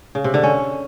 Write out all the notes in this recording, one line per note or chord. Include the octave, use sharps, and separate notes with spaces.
C#3
C3
D3
C#4